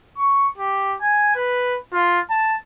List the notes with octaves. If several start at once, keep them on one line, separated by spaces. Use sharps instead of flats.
C#6
G4
G#5
B4
F4
A5